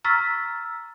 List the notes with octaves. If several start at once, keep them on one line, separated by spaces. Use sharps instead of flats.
A#5 C#6 E6 F6 A6 B6